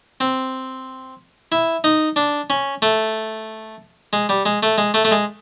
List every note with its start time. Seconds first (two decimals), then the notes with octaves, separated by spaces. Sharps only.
0.21 C4
1.52 E4
1.84 D#4
2.16 D4
2.50 C#4
2.82 A3
4.13 G#3
4.29 G3
4.46 G#3
4.63 A3
4.78 G#3
4.94 A3
5.05 A3
5.11 G#3